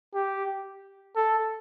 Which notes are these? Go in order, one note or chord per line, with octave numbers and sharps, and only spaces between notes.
G4
A4